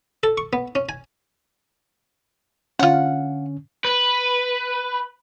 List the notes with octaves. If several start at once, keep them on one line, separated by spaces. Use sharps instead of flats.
A4
C#6
B3
C#4
G#5
D3 C#4 F4 F#5
B4